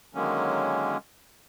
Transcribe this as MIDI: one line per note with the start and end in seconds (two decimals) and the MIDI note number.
0.15 0.97 50
0.15 0.97 51
0.15 0.97 54
0.15 0.97 56
0.15 0.97 58
0.15 0.97 61